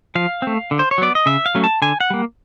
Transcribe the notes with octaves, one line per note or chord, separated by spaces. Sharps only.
F3 F5
A3 C4
D3
C5
C#5
F#3 B3 D5
D#5
C#3 E5
F5
F#3 A3 C#4
A5
D3 G#5
F#5
G3 A#3